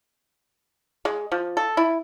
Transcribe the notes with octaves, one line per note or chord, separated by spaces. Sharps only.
G#3
F3
A4
E4